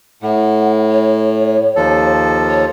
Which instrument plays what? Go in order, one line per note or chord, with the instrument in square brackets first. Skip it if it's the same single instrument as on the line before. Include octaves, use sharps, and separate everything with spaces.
[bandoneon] A2 [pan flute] F#5
[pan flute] C#5
[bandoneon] D#2 F3 A4
[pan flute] C#5